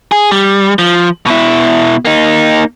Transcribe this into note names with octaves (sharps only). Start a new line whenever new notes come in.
G#4
G3
F3
B2 E4
A#3 D#4